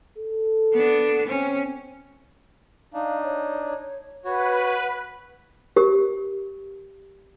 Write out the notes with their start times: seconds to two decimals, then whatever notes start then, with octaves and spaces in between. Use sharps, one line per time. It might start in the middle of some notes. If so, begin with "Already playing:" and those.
0.18 A4
0.73 B3 D4
1.27 C4 C#4
2.94 D4 D#4 F5
3.23 C#5
4.25 F#4 B4 C#5 F#5
5.76 G4 A#4